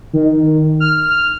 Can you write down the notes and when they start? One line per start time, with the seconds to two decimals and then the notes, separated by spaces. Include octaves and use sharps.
0.13 D#3
0.80 F6